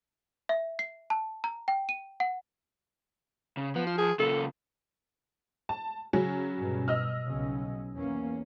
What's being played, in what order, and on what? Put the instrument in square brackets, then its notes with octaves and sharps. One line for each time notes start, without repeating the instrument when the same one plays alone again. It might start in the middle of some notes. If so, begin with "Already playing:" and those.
[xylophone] E5
C7
A5
A#5
G5
D#7
F#5
[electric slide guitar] C#3
[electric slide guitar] F3 [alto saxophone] B3
[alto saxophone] F4
G#4
[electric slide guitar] C#3 A#3 F4 [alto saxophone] A4
[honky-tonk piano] A5
C#3 F#3 C#4
[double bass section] G2 B2
[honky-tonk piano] D#5 E6 F6
[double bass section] B1 C#3 C#4
E2 A#3 C#4